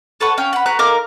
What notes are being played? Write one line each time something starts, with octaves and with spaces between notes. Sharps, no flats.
A4 B4 C#5 F#5
C#4 F5 G5
F#5 B5
F#4 B4 A#5 F#6
D#4 A#4 F5 D6